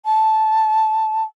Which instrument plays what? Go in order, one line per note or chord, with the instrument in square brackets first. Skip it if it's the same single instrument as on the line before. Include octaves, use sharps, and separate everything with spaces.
[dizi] A5